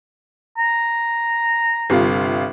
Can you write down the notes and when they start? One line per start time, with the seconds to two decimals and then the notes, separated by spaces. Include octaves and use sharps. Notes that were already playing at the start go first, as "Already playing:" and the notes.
0.58 A#5
1.90 G1 C3 F4